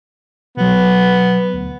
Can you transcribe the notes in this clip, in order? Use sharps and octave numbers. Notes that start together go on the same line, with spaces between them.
B2 F#3 B3
D2